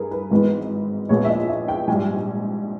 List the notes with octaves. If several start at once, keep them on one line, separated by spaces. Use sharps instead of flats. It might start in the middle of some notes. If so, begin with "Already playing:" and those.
Already playing: G2 G#4 A#4 B4
B4
G#1 G#2 E3 G#3 B3
A#1 A#2 G#3 B3 C#5
E5
D#5
E5
G5
A#1 G#2 G3 G#5